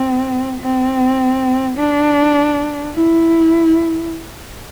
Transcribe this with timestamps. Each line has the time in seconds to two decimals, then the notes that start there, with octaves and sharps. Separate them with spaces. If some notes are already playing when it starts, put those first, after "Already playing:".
Already playing: C4
0.60 C4
1.77 D4
2.95 E4